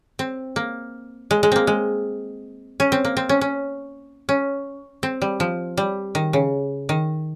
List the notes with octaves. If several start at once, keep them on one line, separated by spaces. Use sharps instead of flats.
C4
A#3
G#3
G#3
A#3 C4
G#3
C#4
C4
A#3
C4
C#4
C#4
C#4
C4
G3
F3
G3
D#3
C#3
D#3